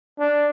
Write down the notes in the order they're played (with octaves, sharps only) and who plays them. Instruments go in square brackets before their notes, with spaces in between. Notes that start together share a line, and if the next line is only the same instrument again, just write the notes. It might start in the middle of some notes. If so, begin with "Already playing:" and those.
[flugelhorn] D4